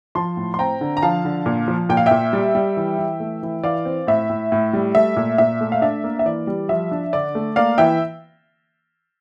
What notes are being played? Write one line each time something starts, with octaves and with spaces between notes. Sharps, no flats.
F3 A5 C6
A2
C6
C4 G5 A#5
D3
A#5
F3 F5 A5
D3
A#2
F3
A#2 G5
F5
A#2 E5 G5
G3
G3
E3
E3
A3
E3
E3 D5 F5
C4
A2 E5
A2
A2
G3
A3 E5
A#2
A#2 E5
A3
F5
D4 E5
A#3
E5
E3 D5
G3
F3 E5
D4
D3 D5
A3
A#3 D5 F5
E3 E5 G5